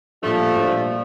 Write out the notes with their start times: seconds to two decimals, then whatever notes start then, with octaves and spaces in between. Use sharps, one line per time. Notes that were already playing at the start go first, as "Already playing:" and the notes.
0.22 A#2 F3 G3 A3 D4
0.56 A#2 G3 D4